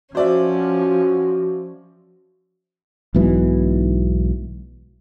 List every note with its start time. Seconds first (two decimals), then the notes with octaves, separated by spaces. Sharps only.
0.15 F3 C#4 F#4 C5 D5 E5
3.14 B1 G#2 B2 E3